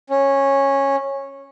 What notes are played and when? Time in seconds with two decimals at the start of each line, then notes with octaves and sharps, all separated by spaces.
0.10 C#4